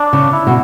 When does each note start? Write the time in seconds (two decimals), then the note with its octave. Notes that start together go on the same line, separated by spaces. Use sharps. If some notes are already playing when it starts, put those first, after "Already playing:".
Already playing: D4
0.13 C#3
0.32 E4
0.47 B2